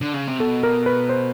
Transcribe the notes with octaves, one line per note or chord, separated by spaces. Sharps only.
D3
C#3
C3
B2 A4
A#4
B4
C5